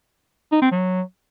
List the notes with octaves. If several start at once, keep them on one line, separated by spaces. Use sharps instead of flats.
D#4
C4
F#3